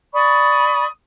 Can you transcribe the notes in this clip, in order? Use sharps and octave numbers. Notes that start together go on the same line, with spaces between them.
D5 B5 C#6 D#6